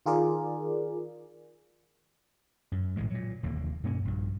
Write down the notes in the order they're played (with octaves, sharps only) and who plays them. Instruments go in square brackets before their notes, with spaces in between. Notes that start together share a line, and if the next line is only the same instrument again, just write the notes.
[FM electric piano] D#3 F4 G#4 A#4 D5
[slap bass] F#2
A#1 A2 D#3 G#3
A#2 F#3
F1 D#2 D3 A#3
G2 B2 A#3 C#4
A#1 G2